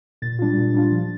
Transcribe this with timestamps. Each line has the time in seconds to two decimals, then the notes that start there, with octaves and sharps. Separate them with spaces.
0.22 A#2 A6
0.39 G3 D4 F4
0.57 A#2
0.74 G3 D4 F4
0.92 F3